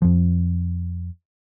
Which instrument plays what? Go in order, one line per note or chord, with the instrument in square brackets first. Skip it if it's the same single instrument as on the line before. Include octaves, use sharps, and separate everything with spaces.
[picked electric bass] F2 F3